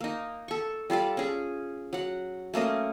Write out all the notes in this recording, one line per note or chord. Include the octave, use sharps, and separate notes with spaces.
A#3 D#4
A4 C#6
G3 F4 A4 D5
C#4 G#4
F#3 F#5
A3 A#3 C#4 D#5